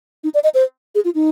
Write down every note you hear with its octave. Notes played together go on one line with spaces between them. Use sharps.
D#4
D5
D#5
C5
G#4
F4
D#4